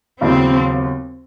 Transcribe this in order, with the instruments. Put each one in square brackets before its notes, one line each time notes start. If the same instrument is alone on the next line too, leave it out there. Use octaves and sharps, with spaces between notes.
[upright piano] D#2 C#3 F#3 B3 E4 [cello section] C4